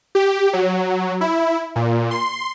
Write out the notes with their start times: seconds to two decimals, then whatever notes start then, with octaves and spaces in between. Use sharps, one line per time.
0.15 G4
0.53 F#3
1.21 E4
1.76 A#2
2.11 C6